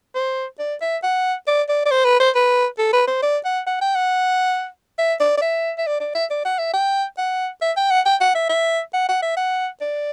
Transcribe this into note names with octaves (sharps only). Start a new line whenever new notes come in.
C5
D5
E5
F#5
D5
D5
D5
C5
B4
C5
B4
A4
B4
C5
D5
F#5
F#5
G5
F#5
E5
D5
D5
E5
E5
D5
D5
E5
D5
F#5
E5
G5
F#5
E5
G5
F#5
G5
F#5
E5
E5
F#5
F#5
E5
F#5
D5